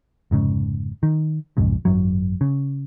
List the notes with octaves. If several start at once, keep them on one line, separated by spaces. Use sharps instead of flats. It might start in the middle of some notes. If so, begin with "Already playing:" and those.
F1 G#2 C#3
D#3
B1 F2 G#2 C#3
G#1 F#2 F#3
C#3